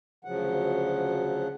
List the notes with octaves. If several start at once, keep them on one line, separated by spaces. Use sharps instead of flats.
D2 C#3 F3 F#3 F#5